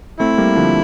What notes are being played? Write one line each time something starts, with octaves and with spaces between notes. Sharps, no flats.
A3 C4 E4
G3 A#3
D3 F3